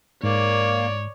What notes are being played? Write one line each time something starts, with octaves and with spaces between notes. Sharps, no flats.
G#2 A#3 C#5 D5